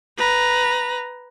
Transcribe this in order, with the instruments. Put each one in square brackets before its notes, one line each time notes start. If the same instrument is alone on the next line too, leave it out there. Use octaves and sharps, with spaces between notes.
[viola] B4 A#5